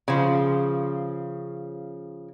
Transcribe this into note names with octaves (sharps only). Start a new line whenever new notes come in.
C#3 F3